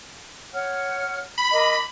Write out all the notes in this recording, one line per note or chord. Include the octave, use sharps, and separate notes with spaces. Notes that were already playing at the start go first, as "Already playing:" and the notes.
C#5 F#5 F6
B5
A#4 D#5 D6